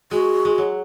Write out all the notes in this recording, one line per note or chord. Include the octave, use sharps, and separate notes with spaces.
G#3 F#4
G#3
F#3